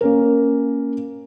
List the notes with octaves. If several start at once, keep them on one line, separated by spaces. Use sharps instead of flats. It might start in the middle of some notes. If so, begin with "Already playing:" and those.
A#3 C#4 A#4